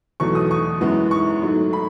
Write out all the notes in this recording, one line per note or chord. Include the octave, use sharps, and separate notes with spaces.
E2 B2 F#3 A3 C#6
D#6
C#6
F#2 E3 G#3 B3
C#6
G#2 F#3 A3
B5